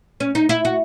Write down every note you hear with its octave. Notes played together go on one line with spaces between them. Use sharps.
C#4
D#4
E4
F#4